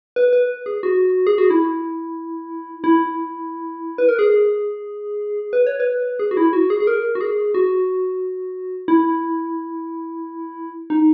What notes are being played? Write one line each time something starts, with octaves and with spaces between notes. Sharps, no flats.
B4
B4
G#4
F#4
G#4
F#4
E4
E4
B4
A#4
G#4
B4
C#5
B4
G#4
F#4
E4
F#4
G#4
G#4
A#4
F#4
G#4
F#4
E4
D#4